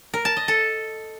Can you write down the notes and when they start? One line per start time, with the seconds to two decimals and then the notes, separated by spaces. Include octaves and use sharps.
0.14 A#4
0.25 A5
0.37 D#5
0.48 A4